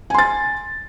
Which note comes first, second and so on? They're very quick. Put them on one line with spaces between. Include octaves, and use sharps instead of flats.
G#5 C6 A6